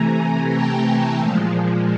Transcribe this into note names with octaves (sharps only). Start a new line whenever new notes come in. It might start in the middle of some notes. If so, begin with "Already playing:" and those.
Already playing: C3 E3 A3 G#5 A#5
G#5 A#5
G5 A5
A#2 F3 G#3